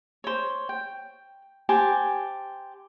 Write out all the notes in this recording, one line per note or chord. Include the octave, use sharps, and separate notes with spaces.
C5 C#5
G5
G4 C5 G#5 A5